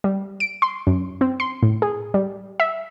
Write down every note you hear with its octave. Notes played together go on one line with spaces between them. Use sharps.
G3
D7
C6
F#2
C4
C6
A2
G#4
G3
E5